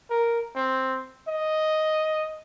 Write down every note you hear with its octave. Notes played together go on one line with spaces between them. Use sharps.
A#4
C4
D#5